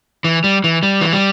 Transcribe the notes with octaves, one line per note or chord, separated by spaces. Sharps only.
E3
G3
E3
G3
E3
G3